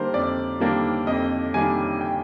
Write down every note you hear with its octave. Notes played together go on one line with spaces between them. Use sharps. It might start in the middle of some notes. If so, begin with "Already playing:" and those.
Already playing: D#3 G3 A#3 D4 A#4 C5
F2 D5
D#3 G3 A#3 D4
F2 D#5
D#3 G3 A#3 D4 G#5
G5